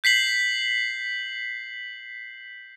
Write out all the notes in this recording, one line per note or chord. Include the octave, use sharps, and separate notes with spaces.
G6 B6 C7 F#7